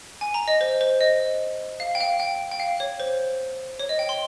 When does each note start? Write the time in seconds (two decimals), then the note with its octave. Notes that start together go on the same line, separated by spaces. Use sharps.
0.21 G#5
0.34 A#5
0.48 D#5
0.61 C5
0.81 C5
1.01 D#5
1.80 F5
1.95 G5
2.00 F5
2.20 G5
2.51 G5
2.60 F5
2.80 C#5
3.00 C5
3.79 C#5
3.89 D#5
3.99 G5
4.09 C6